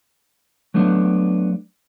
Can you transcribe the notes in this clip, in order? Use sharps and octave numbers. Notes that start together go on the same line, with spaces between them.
F#3 A3 B3 D4